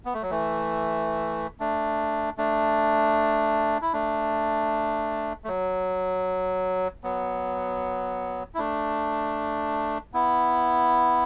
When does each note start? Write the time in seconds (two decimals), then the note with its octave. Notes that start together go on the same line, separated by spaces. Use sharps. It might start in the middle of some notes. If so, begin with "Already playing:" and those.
0.05 B3
0.14 A3
0.22 F#3
0.30 E3 A3
1.60 A3 D4
2.38 A3 D4
3.82 E4
3.93 A3 D4
5.44 A3
5.48 F#3
7.04 F#3 B3
8.54 E4
8.58 A3 D4
10.14 B3 E4